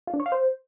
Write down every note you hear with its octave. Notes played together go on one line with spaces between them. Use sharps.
F4
D4
C#5
F5
C5